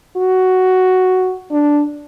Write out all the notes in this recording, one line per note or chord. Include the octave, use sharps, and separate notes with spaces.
F#4
D4